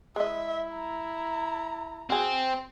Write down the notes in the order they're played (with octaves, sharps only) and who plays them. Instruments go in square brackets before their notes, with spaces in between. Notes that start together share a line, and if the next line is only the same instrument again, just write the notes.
[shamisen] G#3 D#5 [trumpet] E4 [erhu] E5
[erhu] A#5
[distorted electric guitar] C4 [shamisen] F#4 G#4